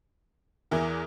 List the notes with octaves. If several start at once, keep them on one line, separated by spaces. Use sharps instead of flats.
E2 E3 A#4